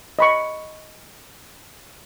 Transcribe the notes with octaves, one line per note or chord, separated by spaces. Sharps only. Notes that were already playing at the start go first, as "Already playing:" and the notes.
D#5 B5 C#6